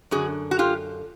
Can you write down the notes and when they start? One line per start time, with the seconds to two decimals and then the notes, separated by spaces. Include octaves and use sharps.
0.11 F#2 D3 F#4 G#4
0.51 F#4
0.59 F4 G4